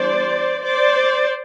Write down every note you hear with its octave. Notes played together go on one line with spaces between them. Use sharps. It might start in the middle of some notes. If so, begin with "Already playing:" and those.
Already playing: E3 G3 B3 D4 C5 D5
C5 D5